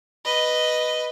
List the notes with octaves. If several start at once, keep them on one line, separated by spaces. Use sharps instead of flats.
B4 D#5